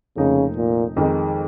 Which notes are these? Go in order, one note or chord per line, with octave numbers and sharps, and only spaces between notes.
F1 F2 C#3 F3 A#3 D#4
A#2
F2 D#3 G#3 D#4